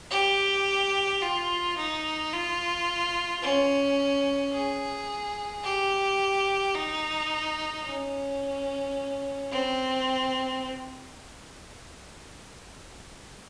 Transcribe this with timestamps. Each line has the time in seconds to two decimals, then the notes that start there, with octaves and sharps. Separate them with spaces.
0.11 G4
1.22 F4
1.78 D#4
2.33 F4
3.43 C#4
4.53 G#4
5.64 G4
6.75 D#4
7.85 C#4
9.51 C4